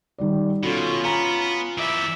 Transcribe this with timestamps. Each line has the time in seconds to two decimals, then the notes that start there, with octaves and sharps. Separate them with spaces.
0.18 D#3 G3 D5
0.63 B2 C#4 F4 F#4 A4
1.04 B3 G#5 A#5
1.78 E3 D5 E5